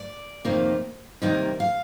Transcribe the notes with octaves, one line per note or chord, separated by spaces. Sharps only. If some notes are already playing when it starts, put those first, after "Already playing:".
Already playing: D5
F2 C3 D#3 A#3 F4
C3 D#3 G3 A#3 D#4
F5